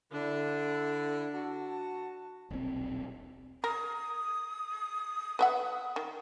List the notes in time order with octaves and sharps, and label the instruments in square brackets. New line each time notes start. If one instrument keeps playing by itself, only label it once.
[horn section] D3 E4 [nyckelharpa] D4
[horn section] F#4 A5
[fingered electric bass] D#1 B1 C#3 C4
[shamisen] A#4 [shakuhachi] D#6
[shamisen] B4 E5 F#5
D#3